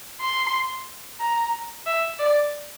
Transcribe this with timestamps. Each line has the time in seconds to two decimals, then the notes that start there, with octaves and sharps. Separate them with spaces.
0.21 C6
1.20 A#5
1.86 E5
2.19 D5